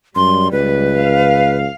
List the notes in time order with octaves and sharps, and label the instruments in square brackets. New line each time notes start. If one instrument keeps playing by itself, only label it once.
[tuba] F#2 [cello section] G3 [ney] C6
[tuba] C#2 [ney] B4
[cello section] F5